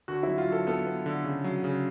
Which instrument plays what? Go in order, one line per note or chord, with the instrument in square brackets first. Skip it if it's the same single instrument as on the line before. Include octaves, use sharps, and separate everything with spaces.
[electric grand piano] D3 [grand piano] F#4
[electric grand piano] F#3 [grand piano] E4
[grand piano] F4
[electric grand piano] F#3 [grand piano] A4
[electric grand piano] B3 [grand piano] A4
[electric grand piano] B3
D3
C#3
F#3
C#3